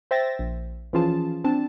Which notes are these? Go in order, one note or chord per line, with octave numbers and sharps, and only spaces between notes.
C5 E5 G5 A6 A#6
A#1
E3 F3 C#4 F4 G#4 A5
C4 D4 A5